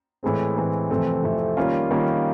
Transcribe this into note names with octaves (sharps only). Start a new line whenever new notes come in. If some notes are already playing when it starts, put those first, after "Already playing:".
A2 E3 G#3 C4
A2 E3 G#3 C4
F2 C3 E3 A3 C4
F2 C3 E3 A3 C4
D#3 G3 A#3 C#4 F4
D#3 G3 A#3 C#4 F4